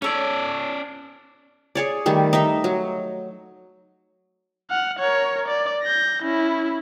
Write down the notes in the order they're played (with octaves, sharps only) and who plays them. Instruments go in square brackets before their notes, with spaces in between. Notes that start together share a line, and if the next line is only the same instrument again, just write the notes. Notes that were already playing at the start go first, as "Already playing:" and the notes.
[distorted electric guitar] C#4 D5 [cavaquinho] A4 C#5
[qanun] G#4 C#5 D5
D#3 G3 A3
D#4 E5
F#3
[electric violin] F#5 F6
A#4 C#5
D5
G6 A#6
C#4 E4